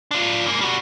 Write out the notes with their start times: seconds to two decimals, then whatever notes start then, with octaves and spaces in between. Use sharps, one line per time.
0.11 D4 F4
0.46 G#2 A#3
0.61 G3 F#4